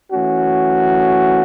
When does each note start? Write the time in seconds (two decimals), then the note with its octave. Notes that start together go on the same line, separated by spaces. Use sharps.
0.11 E3 A3 C#4 F#4